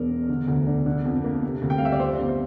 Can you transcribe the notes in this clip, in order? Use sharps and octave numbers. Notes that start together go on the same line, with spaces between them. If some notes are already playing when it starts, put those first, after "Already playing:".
Already playing: E1 E2 D4 A#4
E1
D3
D2
D4
D3
F2
A#3
C3
D2
G5
F5
G3 E5
D5
F2 C5
G1
C5